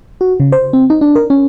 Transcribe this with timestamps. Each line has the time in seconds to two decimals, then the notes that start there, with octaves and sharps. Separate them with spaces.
0.21 F#4
0.40 C#3
0.52 C5
0.73 C4
0.90 D#4
1.01 D4
1.15 A#4
1.30 C#4